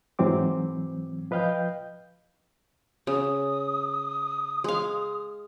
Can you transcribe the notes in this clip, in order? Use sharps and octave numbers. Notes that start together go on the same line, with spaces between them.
G#2 E3 F#3 C4 D6
F3 B4 D#5 F5 G5 G6
C#3 D#6
G#3 F5